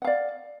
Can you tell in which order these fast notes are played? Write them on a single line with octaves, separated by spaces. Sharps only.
F#5 F5 D5